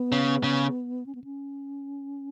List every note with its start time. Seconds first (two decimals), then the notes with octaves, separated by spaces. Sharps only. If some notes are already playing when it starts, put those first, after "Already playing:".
Already playing: B3
0.12 C#3
0.44 C#3
1.06 C#4
1.15 B3
1.24 C#4